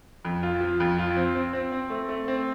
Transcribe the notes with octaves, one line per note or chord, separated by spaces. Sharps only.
F2
F4
F3
F2
F4
C4
C4
C4
C4
A3
A3
C4